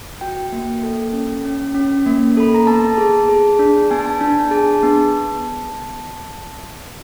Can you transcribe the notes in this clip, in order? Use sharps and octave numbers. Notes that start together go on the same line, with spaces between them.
F#4 G5
A#3
A4
C#4
C#4
C#4
A#3
A4 B5
A#5
B3 A5
G#4
G#4
D4
B3 G#5
A5
G#5
D4
G#4 A5
B3